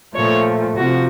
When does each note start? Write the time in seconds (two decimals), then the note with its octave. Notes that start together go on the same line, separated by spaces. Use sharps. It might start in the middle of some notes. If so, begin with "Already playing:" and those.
0.14 A#2 F3 A3 C#5
0.77 C3 F3 F#4